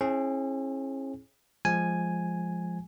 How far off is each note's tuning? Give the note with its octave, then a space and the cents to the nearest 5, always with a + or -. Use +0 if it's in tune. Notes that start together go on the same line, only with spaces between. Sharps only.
C#4 -45 E4 -10 G#4 +20
F3 +0 G#3 +0 G#5 +0